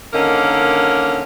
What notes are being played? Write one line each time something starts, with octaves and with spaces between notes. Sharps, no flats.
D3 D#3 A#3 C#4 A#4